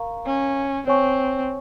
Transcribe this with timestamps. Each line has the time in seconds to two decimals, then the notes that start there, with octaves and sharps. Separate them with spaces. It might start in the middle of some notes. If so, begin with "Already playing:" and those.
Already playing: A#4 F5 A#5 C#6
0.26 C#4
0.87 C4 C#5 G#5 C#6